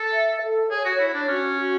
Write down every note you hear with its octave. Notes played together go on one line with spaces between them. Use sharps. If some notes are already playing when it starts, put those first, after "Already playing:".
Already playing: A4
E5
A4
G#4 C#5
F#4
E4 C#5
D4
C#4 F#4
F#4